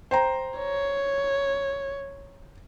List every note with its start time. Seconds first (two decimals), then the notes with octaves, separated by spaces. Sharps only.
0.11 C5 G5 A#5
0.59 C#5